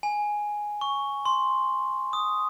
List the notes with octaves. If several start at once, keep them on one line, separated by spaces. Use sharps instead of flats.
G#5
C#6
C6
D#6